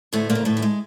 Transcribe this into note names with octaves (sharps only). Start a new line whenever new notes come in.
D2 A2 A3
A#2 A#3
C#3
A2 A3
E3
G#3